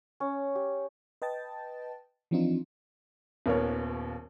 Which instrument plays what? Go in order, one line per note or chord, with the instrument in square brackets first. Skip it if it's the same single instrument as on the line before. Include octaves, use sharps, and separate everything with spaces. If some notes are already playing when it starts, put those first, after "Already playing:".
[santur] C#4
G4
[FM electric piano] B4 D#5 G5 A5 A6
E3 F3 C4 D4 D#4 F4
[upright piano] D#1 D#2 B3 A#4 C#5